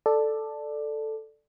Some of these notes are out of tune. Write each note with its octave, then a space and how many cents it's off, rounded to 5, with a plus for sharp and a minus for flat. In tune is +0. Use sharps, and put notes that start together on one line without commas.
A4 +0 D5 +10